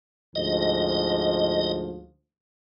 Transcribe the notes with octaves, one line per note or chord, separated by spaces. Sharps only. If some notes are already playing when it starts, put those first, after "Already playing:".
D2 G#2 F3 D#5